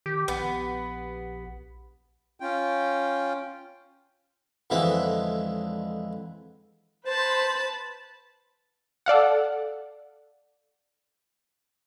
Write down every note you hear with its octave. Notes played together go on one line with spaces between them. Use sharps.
D#3 G4
A#1 B3
C#4 F4 G5
F2 D3 E3 G#3 B5
B4 C5 A5 B5
A4 D5 F5 F#5